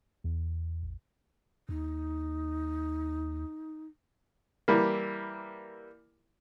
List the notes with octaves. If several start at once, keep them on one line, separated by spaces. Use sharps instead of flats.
E2
A1
D#2 D#4
E3 G3 A#3